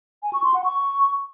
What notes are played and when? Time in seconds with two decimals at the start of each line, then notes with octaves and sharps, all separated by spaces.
0.23 G#5
0.33 C#6
0.44 C6
0.54 F#5
0.64 C#6